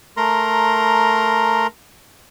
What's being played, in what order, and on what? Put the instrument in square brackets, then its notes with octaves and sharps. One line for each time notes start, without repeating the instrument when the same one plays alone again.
[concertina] A3 A#4 A#5 C6